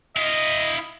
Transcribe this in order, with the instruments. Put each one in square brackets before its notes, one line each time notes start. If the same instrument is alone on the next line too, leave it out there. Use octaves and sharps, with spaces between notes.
[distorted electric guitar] E4 F5 [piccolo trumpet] D#5